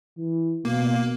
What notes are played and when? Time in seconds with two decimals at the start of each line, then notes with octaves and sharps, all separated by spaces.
0.18 E3
0.65 B2 A#3